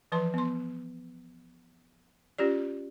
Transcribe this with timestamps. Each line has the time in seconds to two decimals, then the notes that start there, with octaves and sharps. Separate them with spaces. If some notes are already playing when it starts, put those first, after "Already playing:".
0.12 E3 F3 B4 A5 C6
0.34 B3 C6
2.38 C#4 F4 G4 D5